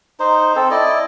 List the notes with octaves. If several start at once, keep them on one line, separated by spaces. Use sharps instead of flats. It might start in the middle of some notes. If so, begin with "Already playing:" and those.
D#4 C5
C4 A4
E4 D5 D#5